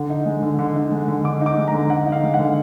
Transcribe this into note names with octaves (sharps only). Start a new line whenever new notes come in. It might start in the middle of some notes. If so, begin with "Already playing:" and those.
Already playing: D3
D#4
G#3
D3
D3
D#4
G#3
D3
D3 D6
D#4
D6
G#3
A#5
D3
D3 F#5
D#4
F5
G#3
F#5
D3